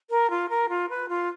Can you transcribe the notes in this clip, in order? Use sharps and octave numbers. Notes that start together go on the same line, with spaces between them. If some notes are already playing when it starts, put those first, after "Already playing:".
A#4
F4
A#4
F4
B4
F4